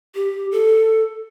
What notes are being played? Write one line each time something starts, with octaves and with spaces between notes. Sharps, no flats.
G4
A4